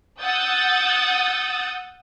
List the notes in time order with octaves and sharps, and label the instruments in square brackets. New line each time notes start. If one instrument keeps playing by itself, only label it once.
[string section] F#5 D#6 E6 G6 A6